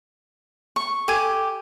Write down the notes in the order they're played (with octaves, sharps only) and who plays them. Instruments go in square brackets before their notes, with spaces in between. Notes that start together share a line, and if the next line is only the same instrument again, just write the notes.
[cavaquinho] C#6
[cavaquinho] G4 [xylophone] A4 G#5 G#6